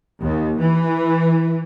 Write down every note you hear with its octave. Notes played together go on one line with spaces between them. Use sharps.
D#2
E3